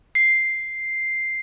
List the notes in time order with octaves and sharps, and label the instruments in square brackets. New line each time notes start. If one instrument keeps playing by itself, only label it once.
[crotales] C7